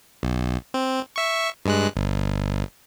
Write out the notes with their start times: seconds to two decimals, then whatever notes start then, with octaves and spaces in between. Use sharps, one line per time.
0.23 B1
0.74 C4
1.16 E5 C#6
1.65 G2 G#3 F#6
1.96 G1